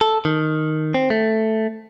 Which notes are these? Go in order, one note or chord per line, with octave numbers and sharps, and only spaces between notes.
A4
D#3
C4
A3